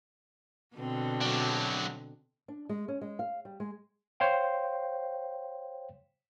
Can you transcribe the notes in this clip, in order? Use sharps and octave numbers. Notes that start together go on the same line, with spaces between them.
B2 D3 C4
F#3 D4
D4
G#3
C#4
G#3
F5
G3
G#3
C5 C#5 F5 G5